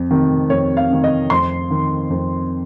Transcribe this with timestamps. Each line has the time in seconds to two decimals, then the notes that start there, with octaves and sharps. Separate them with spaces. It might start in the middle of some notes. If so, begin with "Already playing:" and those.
Already playing: F2
0.11 C3 D#3
0.50 F2 C#5
0.77 F5
0.90 C3 D#3
1.04 D#5
1.30 F2 C6
1.70 D#3
2.10 F2